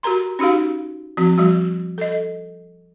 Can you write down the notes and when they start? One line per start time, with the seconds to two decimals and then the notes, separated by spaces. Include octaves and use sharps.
0.03 F#4 G4 A#4 A#5 C6
0.39 C#4 D#4 F#4 G4 F5
1.17 F3 C4 F#4
1.38 F3 G3 F#4
1.98 A4 D#5